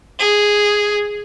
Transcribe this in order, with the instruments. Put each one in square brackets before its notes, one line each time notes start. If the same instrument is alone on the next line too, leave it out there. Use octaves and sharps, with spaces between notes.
[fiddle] G#4